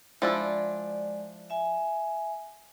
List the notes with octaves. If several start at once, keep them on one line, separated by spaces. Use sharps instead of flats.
F3 G#3 D4 E4 D5
E5 G#5